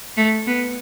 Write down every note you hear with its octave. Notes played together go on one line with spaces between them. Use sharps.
A3
B3